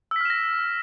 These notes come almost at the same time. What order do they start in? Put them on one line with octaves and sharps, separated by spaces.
E6 B6 F6 E7 A#6